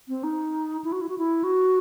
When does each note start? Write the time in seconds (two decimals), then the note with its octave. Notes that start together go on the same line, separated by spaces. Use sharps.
0.09 C4
0.24 D#4
0.84 E4
0.92 F#4
1.01 E4
1.09 F#4
1.18 E4
1.44 F#4